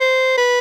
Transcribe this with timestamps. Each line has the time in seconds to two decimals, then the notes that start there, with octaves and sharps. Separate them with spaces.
0.01 C5
0.38 B4